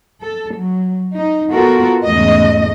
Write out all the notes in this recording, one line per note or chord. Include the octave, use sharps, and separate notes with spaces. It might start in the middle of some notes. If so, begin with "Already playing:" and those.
A4
F#3
D#4
B3 F4 F#4 A4 A#4
E2 G#2 C#3 A3 D#5